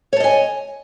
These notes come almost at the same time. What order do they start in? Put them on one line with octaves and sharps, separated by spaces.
C#5 A5 D#5 G#5